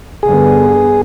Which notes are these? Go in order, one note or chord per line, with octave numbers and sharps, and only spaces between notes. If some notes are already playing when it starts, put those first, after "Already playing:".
G2 D3 B3 G#4